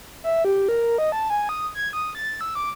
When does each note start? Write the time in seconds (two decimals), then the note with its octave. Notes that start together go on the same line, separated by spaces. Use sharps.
0.24 E5
0.45 G4
0.69 A#4
0.98 D#5
1.12 A5
1.30 G#5
1.49 D#6
1.75 G#6
1.93 D#6
2.15 A6
2.41 E6
2.55 D6